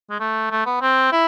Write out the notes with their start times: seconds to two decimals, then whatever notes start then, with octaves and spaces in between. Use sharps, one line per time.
0.10 G#3
0.20 A3
0.51 A3
0.66 B3
0.81 C4
1.12 E4